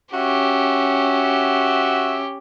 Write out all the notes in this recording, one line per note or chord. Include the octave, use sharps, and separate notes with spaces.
C#4 F#4 G4 E5